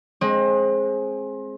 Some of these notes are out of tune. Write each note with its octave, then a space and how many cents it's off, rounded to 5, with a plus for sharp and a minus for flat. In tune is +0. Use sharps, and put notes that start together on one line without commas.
G#3 +10 C4 +30